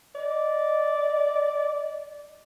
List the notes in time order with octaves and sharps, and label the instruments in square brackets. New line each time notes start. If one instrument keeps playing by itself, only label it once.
[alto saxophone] D5 [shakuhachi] D#5